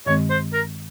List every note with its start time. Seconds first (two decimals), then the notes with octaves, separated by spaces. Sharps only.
0.06 G2 D#3 G#3 C4 C#5
0.30 C5
0.53 A#4